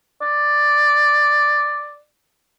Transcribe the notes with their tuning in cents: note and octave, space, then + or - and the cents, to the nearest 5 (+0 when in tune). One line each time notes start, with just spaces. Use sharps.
D5 +5